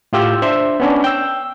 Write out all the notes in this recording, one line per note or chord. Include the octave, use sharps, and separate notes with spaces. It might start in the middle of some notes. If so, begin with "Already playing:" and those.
A2 F4 G4 E6 G6
D4 C5 E5
B3 C#4 D4
G5 E6